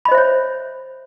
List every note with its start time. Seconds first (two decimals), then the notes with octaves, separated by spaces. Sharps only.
0.05 B5
0.08 D#5
0.12 C5
0.15 E5
0.18 C#5